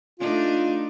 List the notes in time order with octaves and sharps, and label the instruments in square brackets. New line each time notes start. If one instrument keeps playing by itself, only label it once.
[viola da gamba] A3 D4 D#4 [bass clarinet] F4